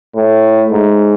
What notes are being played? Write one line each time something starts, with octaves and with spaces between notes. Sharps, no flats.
A2
G#2